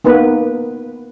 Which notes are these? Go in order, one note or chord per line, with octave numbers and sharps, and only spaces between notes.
A#3 B3 D#4 B4